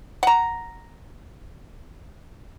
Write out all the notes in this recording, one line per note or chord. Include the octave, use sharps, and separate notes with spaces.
F#5 A#5